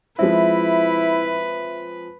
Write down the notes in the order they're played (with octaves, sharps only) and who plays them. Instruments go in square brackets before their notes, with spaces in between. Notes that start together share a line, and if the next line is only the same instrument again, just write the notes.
[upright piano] F3 G#3 C4 [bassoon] E4 [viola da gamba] B4 [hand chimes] E5